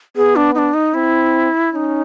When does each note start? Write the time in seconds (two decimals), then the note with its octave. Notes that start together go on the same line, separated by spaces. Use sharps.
0.16 B3 G#4
0.36 D4
0.55 D#4
0.58 D4
0.74 D#4
0.94 C4 E4
1.72 C#4 D#4 E4